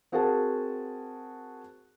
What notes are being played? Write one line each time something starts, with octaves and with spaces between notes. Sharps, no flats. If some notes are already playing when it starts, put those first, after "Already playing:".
C4 F#4 G#4 A#4 F#5 A5